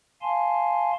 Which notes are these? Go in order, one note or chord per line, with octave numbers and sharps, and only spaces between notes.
F5 G#5 A5 C6